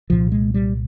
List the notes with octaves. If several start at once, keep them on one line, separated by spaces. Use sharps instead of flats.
C2 A#2 F3
G#3
G3